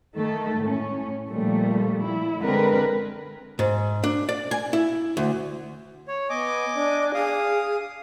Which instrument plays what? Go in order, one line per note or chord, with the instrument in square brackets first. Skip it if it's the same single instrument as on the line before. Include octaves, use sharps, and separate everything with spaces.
[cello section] D#3 A3 A4
A2 C#4
A#2 D#3 F3 G3 A3
E4
D3 G#3 C4 A#4 B4
[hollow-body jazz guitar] G#2
D4
D5
G#5
E4
D2
[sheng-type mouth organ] C#5
[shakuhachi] B3 [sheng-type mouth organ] D#5 G#5 D6
[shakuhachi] D4
[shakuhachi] G#4 [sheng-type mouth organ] F5 D#6